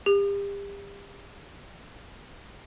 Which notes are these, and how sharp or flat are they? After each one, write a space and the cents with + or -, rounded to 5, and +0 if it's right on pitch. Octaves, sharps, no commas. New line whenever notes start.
G4 +35